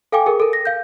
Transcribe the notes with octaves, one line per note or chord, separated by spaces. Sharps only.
A4 F5 G5 G#5 D6
G#4 A#4
A4 A#4
A#6
F5 G6